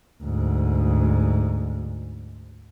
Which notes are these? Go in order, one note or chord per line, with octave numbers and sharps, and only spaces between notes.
D2 G#2